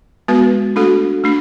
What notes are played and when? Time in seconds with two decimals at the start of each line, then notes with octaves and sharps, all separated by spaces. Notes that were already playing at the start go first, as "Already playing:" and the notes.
0.28 G#3 B3 F#4 B4
0.76 A3 D4 F#4 A4
1.24 A3 D4